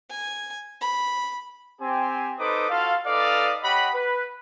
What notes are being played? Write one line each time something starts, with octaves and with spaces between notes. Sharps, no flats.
G#5
B5
C4 G4 G#5
D#4 A4 B4 C5 D6 D#6
F4 F#4 A4 F5
D#4 A4 B4 D5 D#5 F5
G4 C#5 D#5 F#5 B5
B4